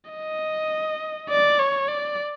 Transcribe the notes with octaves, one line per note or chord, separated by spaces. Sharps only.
D#5
D5
C#5
D5